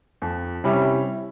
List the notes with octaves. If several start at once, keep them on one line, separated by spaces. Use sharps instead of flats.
F2
C3 G3 C#4 E4